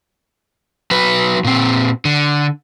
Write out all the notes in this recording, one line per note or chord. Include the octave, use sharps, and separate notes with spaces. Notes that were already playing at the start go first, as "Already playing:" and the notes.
F#3 B4
A#2 C4
D3